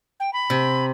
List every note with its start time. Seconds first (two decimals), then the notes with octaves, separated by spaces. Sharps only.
0.20 G5
0.33 B5
0.50 C3